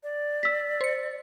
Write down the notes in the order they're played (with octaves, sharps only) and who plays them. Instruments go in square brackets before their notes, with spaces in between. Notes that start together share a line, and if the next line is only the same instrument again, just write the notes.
[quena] D5
[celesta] E6 B6
[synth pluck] C5 C#7